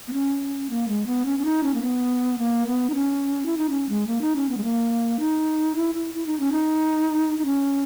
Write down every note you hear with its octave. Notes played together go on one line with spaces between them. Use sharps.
B3
C#4
A#3
G#3
B3
C#4
C#4
D#4
C#4
A#3
B3
A#3
B3
D#4
C#4
E4
D#4
C#4
G#3
A#3
D#4
C#4
B3
G#3
A#3
D#4
E4
E4
E4
D#4
C#4
D#4
D#4
C#4